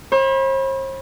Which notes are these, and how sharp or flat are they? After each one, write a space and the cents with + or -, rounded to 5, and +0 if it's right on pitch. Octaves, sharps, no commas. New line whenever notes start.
C5 +45 B5 -20